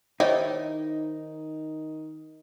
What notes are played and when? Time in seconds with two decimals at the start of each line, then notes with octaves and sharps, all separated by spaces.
0.20 D#3 D#4 E4 G4 C5 C#5 D#5